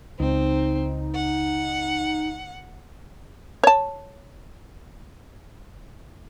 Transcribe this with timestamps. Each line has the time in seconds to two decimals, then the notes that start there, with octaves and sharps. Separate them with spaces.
0.20 C#2 C4 D#4
1.15 F#5
3.64 C#5 A5